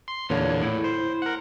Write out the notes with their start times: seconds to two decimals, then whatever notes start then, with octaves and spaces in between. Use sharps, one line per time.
0.08 C6
0.30 E2 A#2 D3 C#5
0.62 A2 E4
0.84 C5
1.22 A#4 F#5